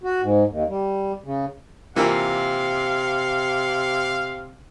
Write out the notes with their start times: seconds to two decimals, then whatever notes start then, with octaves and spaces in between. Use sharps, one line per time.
0.03 F#4
0.22 G#2
0.48 D#2
0.68 G3
1.24 C#3
1.96 C3 E3 A#3 F4 F5